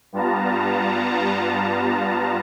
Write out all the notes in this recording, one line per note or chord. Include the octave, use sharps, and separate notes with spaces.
G2 G3 B3 F4 A5 A#5